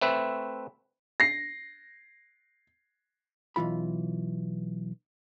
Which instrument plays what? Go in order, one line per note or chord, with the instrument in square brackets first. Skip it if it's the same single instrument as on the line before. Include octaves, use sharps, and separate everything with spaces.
[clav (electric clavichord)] A3 C4 B4 E5
[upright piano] A#6 C7
[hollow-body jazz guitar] B1 F#2 E3 F4 B5